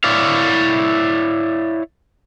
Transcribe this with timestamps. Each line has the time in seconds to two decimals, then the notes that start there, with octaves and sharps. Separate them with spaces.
0.04 E4 C#5 D5 F5